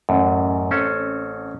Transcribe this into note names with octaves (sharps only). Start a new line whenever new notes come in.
A1 F#2
C4 C#4 A4